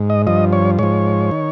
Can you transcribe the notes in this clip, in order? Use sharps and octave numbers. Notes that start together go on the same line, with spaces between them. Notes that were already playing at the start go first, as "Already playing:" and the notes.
Already playing: G#2
D#5
G2 F3 D#5
C#5
G#2 F3 C#5
D#3